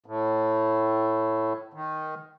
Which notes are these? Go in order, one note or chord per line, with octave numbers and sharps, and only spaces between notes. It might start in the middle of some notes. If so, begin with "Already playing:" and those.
A2
D#3